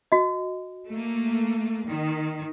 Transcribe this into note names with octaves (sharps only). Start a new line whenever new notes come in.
F#4 D#5
A3 A#3
D#3